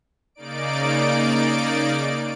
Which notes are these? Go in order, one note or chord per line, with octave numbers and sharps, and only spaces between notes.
C#3 A#3 D#4 D5 D7